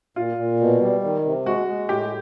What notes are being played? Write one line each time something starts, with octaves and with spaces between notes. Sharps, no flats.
A#2 F4
A#2
B2
G3
D#3
C3
G#3 F#4
G#3
A2 G4